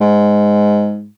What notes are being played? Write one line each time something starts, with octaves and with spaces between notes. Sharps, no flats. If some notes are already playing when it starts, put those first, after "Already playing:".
G#2